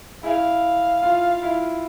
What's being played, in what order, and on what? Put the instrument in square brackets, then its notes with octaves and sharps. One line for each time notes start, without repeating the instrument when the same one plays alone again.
[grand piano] E4 [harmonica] G#4 F5
[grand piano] F4
E4